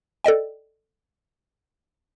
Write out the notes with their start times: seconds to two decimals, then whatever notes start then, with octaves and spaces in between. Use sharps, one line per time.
0.24 A4 D5 D#5 G5